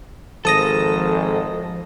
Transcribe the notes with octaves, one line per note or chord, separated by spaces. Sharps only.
G#1 F3 A4 A5 D#6 A#6